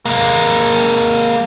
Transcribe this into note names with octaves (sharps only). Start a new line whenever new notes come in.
G#3 A#3